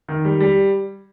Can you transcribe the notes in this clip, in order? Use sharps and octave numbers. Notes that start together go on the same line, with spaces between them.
D#3
G3
G3